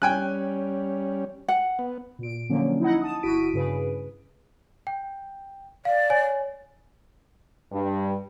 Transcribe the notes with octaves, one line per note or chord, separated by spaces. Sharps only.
G3 C#4 G5 G#5 F#6
F#5
B3
A#2 D7
D3 F3 F#3 A#3 C#4
D#4 E4 D#5 F#5
A5 D#6
G1 E4 F#4 B6 D7 D#7
G2 C#3 G#4 B4
G5
D5 F5
C#5 G#5
G2